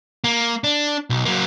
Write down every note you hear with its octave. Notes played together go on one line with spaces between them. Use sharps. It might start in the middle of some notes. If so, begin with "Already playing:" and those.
A#3
D4
B1
F#3 A#3